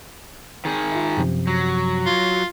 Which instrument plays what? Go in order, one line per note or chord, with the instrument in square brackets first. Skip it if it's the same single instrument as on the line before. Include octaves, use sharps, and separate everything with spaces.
[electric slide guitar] D#3 G#4
[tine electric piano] F4 E5
F#2 C3 F3
[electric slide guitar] F#3
[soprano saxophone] F4